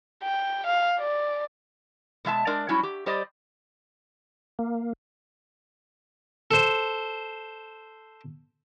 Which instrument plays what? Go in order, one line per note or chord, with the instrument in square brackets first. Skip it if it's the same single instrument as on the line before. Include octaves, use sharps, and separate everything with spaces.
[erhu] G5
F5
D5
[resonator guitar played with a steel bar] B2 G#3 E5 A5
G#3 D4 A#4 D5
F#3 G3 C#4 E4 F#4
G4
G3 G4 C5 D5 D#5
[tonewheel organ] A#3
[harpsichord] A4 C5